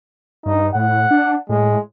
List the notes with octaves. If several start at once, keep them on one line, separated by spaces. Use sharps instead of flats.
G2 D#4
A2 F#5
D4
A2 G#3